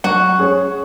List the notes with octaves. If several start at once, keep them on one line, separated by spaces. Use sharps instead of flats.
F#3 F#4
C#4 G#4 C#5